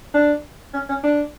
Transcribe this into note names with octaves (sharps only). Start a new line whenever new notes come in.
D4
C#4
C#4
D4